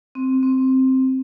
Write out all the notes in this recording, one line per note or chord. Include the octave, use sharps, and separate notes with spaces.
C4
C4